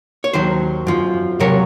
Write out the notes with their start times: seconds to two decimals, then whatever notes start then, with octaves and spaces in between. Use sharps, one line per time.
0.24 C#5
0.33 D#2 D#3 F#3 C5
0.87 F#2 F3
1.40 C#2 C3 F#3 A#4 C#5